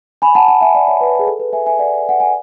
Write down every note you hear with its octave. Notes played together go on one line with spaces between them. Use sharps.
G#5 B5
F#5 A5
F#5 A5
E5 G#5
D5 F#5
C#5 E5
B4
G#4
A4
B4
E5 G#5
E5 G#5
D5 F#5
F#5
G#5